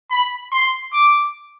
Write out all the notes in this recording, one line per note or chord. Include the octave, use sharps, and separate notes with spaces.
B5
C6
D6